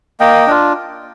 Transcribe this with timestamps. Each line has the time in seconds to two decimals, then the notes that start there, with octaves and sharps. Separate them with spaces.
0.20 A#3 D#5 G5
0.47 D4 F4